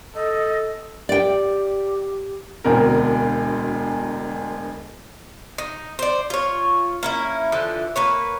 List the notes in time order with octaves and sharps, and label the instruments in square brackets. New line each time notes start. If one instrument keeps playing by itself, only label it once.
[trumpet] A4 [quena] D#5
[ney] G4 [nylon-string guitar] D5 G5
[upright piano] E1 D2 B2 C4 A#4
[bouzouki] D#4
C5 D5
F4 C#5
A#3 C#4 E4
D3 E3 F3
A#3 B4 C#5